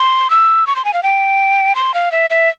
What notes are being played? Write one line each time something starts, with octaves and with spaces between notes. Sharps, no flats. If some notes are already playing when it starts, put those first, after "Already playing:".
Already playing: C6
E6
C#6
C6
G#5
F5
G5
C6
F5
E5
E5